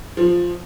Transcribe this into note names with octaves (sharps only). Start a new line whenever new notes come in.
F3